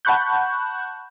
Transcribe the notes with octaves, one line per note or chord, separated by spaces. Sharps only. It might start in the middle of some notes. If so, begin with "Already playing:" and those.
F#5 A5 B5 C#6 F#6 G6